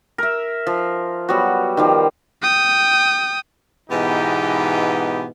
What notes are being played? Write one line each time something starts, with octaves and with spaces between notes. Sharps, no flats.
A#4 E5
F3
F#3 G3 B3 F#4
D#3 F3 G3
G5 D#6
G#2 B2 E3 B3 D#4 G4